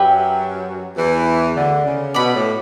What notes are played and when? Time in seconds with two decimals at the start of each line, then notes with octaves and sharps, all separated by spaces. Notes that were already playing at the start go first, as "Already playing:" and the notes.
Already playing: F#2 F#3 G4 B4 E5 G5
0.97 E2 E3
1.55 D2 D3
1.85 C#3
2.14 B2 D5 F#5 B5
2.34 A2